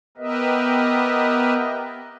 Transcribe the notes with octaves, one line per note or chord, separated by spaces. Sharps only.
B3 G4 A#4 B4 D#5 E5